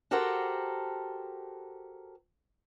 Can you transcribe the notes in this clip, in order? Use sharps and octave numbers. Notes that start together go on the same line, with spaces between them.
F#4 G4 A4 A#4 C5 F#5